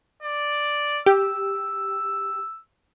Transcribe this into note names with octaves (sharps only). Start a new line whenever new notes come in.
D5
G4 E6